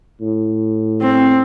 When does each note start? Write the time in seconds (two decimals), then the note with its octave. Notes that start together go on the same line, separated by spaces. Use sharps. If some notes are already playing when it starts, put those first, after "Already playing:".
0.21 A2
1.01 C4